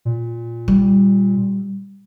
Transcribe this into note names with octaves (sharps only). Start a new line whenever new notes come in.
A#2
G3